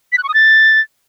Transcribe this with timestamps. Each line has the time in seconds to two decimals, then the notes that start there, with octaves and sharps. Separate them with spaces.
0.13 B6
0.18 F#6
0.23 C#6
0.29 D#6
0.34 A6